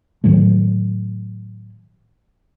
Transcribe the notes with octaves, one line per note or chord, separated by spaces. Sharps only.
A2 D#3 F#3 A3